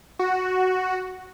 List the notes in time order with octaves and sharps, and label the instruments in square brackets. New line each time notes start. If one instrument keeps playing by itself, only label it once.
[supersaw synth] F#4